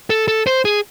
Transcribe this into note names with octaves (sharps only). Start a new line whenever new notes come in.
A4
A4
C5
G#4